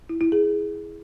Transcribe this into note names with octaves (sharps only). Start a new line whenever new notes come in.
E4
E4
G#4